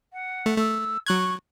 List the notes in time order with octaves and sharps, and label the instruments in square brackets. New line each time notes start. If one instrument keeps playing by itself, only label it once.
[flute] F#5
[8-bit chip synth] A3
[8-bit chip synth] A3 [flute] E6
[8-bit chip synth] F#3 F#6 G#6 [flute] C#6